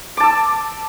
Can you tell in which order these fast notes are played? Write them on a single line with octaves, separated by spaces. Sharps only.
D6 A5 E6